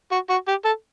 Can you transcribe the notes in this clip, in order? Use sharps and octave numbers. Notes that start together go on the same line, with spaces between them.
F#4
F#4
G4
A4